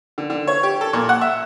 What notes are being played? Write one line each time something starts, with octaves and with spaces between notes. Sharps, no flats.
D3
D3
C#5
G4
A4
A#2
F#5
E5